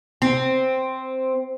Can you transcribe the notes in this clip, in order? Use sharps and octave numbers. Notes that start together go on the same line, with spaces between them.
C4